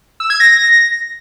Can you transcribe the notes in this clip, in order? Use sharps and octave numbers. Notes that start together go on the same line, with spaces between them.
E6
G#6
A#6